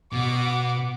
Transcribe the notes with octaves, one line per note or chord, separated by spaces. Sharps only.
B2 F#5 D6